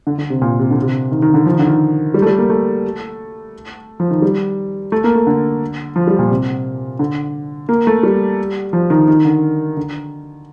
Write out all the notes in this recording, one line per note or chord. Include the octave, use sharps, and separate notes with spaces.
D3
D3
C3
A#2
C3
D3
C3
D#3
D#3
D3
F3
D#3
D3
D#3
G3
A3
G3
A#3
A3
F3
D#3
G3
A3
A#3
A3
D3
F3
G3
A#2
C3
D3
A#3
A3
G3
F3
D#3
D#3
D3
D3